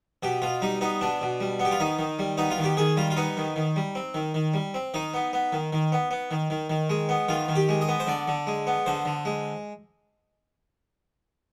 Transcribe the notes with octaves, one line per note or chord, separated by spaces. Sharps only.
B2 G4
B2 F4
G3 D#4
B3 D#4
B2 D4
B2
G3
B3
G4
F4
D#3 D#4
D#3
G3
B3 D#4
F4
D#3
G4
D#3 G#4
G3 F4
F4
B3 D#4
D#3
D#3
G3
C4
D#3
D#3
G3
C4
D#3 D#4
B3
B3
D#3
D#3
B3
B3
D#3
D#3
D#3
G#3
B3
D#3 F4
D#3
G4
G#3
D#5
B3
C5
D3 D5
D3
G#3
B3
D3 C5
D3
G#3